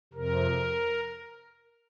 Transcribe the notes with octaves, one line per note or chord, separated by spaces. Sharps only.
F2 C3 A#4